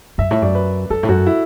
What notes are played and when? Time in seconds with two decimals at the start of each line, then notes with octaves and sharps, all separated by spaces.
0.18 F#2 E5
0.31 A2 E5
0.42 F#2 D5
0.55 B4
0.90 F#2 A4
1.03 A2
1.09 F#2 F#4
1.26 E4